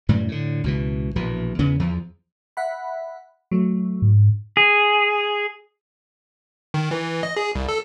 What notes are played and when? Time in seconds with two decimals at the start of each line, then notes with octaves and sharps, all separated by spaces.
0.09 F#2 A2 E3 G3
0.28 A2 D3
0.64 C#2 B2 E3
1.16 A#1 B2 E3
1.59 E2 C#3 E3 B3
1.79 E2 F3
2.57 E5 F#5 B5
3.51 F#3 A3
4.02 G#2
4.57 G#4
6.74 D#3
6.91 E3
7.23 D#5
7.37 G#4
7.55 C2
7.69 A4